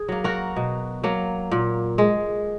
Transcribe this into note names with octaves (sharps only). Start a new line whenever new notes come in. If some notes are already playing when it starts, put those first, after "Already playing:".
Already playing: G#4
F#3 A#3
F#4 A#4
B2
F#3 A#3
A#2
G#3